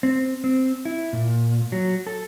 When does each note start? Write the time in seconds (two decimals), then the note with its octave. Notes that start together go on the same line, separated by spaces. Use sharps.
0.03 C4
0.44 C4
0.85 E4
1.13 A#2
1.72 F#3
2.07 A4